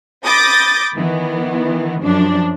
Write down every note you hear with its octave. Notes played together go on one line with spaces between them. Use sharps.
B5 D6 D#6 G6 A6 A#6
D#3 E3 B3
F#2 F3 D4